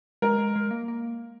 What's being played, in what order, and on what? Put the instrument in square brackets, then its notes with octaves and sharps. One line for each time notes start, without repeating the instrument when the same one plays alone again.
[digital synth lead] G#3 [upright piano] A#4
[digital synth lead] G#3
G#3
A#3
A#3